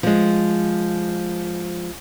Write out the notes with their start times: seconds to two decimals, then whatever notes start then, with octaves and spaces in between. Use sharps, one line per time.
0.03 F3 G#3